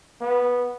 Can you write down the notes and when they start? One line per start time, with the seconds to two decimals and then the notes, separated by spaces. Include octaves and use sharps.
0.21 B3